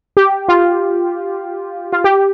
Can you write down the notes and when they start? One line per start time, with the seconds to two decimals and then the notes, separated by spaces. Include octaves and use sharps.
0.17 G4
0.48 F4
1.93 F4
2.04 G4